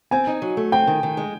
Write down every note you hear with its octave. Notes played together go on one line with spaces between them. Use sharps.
C4 G#5
D#4
F#3
A3
C4 G5
D#3
D#3
G#3